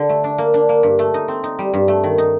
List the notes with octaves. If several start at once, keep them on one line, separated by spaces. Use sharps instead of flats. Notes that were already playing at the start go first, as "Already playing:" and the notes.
Already playing: D3
A3
D4
A#3
D4
A#3
G2
A3
D#4
C4
D#4
G3
G2
A3
D#3
D#4